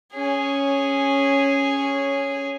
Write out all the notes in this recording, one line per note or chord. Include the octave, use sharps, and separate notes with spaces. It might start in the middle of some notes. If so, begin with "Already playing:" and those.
C#4 G#4